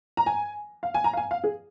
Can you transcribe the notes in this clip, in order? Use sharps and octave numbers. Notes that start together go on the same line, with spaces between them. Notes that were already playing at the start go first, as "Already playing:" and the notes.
A#5
G#5
F5
G#5
A#5
F5
G#5
F5
G#4